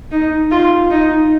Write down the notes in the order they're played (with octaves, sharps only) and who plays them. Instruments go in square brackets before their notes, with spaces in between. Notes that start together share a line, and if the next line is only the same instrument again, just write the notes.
[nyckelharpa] D#4
F4
D#4